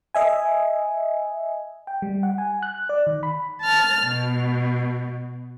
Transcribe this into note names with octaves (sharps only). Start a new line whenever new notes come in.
D#5 E5 G#5
G5
G3
F#5
G#5
F#6
D5
D#3
B5
A5 F6
B2